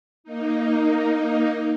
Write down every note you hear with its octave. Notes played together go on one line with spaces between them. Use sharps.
A#3 D#4